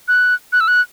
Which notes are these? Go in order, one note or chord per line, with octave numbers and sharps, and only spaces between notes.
F#6
F#6
E6
F#6